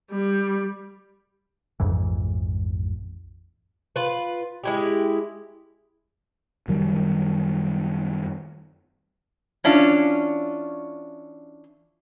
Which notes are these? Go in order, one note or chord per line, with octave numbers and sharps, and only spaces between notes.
G3
A#1 F2 G#2 E3
F4 B4
G#3 E4 G4
F#2 D#3 G3
E3 C#4 D4 F4